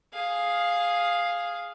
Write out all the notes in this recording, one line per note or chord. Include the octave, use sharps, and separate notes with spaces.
G#4 F5